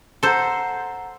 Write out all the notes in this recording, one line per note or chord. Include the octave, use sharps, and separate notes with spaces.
A4 C5 F#5 A#5 C6